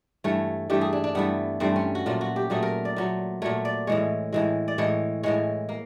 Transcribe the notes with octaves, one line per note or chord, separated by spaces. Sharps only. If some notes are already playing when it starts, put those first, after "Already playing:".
G2 E3 A3 C#5
G2 E3 A3 G4
G#4
D4
D4
G2 E3 A3 B3
G2 E3 A3 C4
C#4
F#4
A#2 F#3 A3 F4
F#4
G4
A#2 F#3 A3 G#4
A#4
D5
A#2 F#3 A3
A#2 F#3 A3 C#5
D5
A2 E3 G#3 C#5
A2 E3 G#3
D5
A2 E3 G#3 C#5
A2 E3 G#3 C#5
A#3